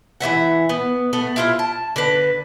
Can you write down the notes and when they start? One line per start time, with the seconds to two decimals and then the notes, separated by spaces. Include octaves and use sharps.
0.21 E3 B3 E5 F#5
0.69 B3
1.13 A3 B3
1.36 E4 F4 C5
1.59 A5
1.96 D3 B4